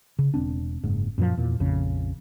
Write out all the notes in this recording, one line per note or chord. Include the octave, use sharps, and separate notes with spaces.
C#3
E1 C4 D4
F#1 G#2
F#2 A#2 E3 F3
E2 A#2
A#1 F2 C#3